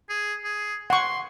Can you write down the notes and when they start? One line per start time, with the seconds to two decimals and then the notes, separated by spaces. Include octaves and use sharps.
0.09 G#4
0.44 G#4
0.90 F#5 C6 C#6